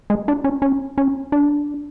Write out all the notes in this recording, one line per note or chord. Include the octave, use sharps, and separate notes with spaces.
G#3
D4
C#4
C#4
C#4
D4